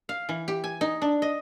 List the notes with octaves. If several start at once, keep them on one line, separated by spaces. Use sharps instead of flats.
F5
E3
G4
G#5
D#4
D4
D#5